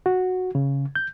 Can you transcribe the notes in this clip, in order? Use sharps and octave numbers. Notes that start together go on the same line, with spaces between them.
F#4
C#3
G6